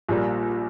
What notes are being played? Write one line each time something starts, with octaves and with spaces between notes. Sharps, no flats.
A#1 A#2 G3 A#3